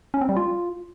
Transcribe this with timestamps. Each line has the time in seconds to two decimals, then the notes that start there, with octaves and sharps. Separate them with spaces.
0.14 C#4
0.21 C4
0.29 G3
0.37 F4